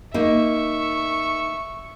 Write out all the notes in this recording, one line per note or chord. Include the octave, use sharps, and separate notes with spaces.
A#3 D#4 E5 C#6